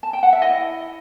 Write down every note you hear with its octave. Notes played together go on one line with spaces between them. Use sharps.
A5
G5
F#5
E5
E4 D#5